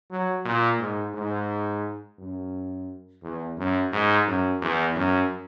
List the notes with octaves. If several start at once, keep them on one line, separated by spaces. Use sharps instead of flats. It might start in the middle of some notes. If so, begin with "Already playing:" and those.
F#3
A#2
G#2
G#2
F#2
E2
F#2
G#2
F#2
E2
F#2